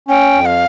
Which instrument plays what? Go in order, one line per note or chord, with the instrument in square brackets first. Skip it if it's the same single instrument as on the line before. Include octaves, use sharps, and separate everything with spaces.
[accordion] C#4 [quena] G5
[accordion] F2
[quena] F5